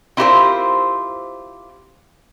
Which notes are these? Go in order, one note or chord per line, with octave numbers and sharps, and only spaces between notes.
C4 E4 F4 G4 A#4 C5